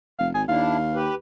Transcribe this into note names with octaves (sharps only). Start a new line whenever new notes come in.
F1 F5
G#1 G#5
D#2 D4 E4 F5
G4 B4